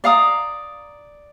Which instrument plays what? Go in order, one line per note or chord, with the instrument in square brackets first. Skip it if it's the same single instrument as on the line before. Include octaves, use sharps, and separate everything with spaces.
[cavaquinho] D5 F5 A#5 D#6